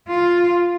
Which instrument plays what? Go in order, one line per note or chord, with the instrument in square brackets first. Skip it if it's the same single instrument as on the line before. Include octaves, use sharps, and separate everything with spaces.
[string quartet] F4